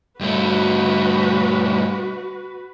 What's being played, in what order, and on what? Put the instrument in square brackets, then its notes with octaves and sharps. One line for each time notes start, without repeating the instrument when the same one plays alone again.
[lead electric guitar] G2 A3 [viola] F#4 B4